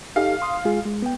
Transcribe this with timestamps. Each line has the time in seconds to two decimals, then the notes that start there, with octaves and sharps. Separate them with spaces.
0.16 D#4 G4 A4 F5
0.42 C6 D#6
0.65 G#3 F4 G#4
0.85 G#3
1.02 B3 G5